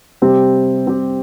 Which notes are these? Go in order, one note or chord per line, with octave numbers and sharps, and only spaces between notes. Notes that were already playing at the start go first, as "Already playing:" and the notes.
C3 G3 C4 G4
C3 G3 C4 G4